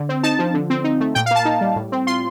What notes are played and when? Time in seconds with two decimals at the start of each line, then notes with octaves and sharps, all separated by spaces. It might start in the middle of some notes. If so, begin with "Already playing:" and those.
Already playing: D3
0.09 C4
0.23 D#4 A5
0.39 F3
0.54 D3
0.70 C4
0.84 D#4
1.00 A3
1.15 A#2 G5
1.26 F5
1.31 A#3 A5
1.45 D#4
1.61 G3
1.76 A2
1.92 C4
2.07 F4 C6